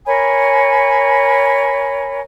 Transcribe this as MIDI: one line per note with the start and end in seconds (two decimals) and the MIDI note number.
0.06 2.20 70
0.06 2.20 73
0.06 2.20 80
0.06 2.20 83